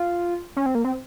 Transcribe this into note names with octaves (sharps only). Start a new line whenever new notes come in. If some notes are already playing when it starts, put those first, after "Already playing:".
Already playing: F4
C#4
C4
A#3
C4